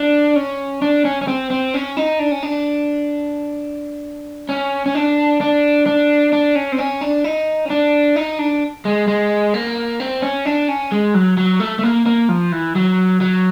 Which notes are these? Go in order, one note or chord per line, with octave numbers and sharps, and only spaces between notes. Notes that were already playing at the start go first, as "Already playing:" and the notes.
Already playing: D4
C#4
D4
C#4
C#4
C4
C4
C#4
D#4
D4
C#4
D4
C#4
C#4
D4
D4
D4
D4
C#4
C4
C#4
D4
D#4
C#4
D4
D#4
D4
G#3
G#3
A#3
C4
C#4
D4
C#4
G#3
F#3
F#3
A3
A3
A#3
A#3
F3
E3
F#3
F#3